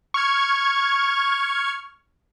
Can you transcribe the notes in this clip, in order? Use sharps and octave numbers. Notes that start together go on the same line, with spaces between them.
C#6 F6 G#6